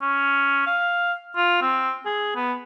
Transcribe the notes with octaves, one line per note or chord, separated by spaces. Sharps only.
C#4
F5
F4
C4
G#4
B3